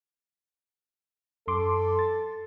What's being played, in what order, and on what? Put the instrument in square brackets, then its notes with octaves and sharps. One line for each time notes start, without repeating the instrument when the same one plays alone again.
[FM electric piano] F#2 C6 D6 [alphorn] A4
[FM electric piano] A6